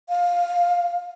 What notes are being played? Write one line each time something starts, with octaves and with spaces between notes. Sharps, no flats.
F5